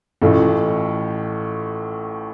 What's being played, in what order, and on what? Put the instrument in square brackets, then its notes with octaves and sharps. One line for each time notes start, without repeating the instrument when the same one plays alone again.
[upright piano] A1 A2 A3 F4